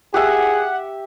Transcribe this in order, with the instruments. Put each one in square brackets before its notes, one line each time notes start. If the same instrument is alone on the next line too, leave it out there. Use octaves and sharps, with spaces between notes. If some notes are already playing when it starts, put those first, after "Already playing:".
[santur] G4 E5 [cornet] G#4 [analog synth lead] F#5